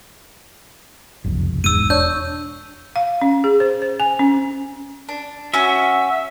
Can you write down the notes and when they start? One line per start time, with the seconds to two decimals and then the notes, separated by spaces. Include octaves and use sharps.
1.24 F#1 C2 F2
1.64 E1 G#2 E6 D#7
1.90 D4 C#5 G6
2.96 F5
3.22 C#4
3.44 G#4
3.60 C5
3.82 C5
4.00 G#5
4.19 C#4
5.09 D4
5.54 C#4 F#4 E5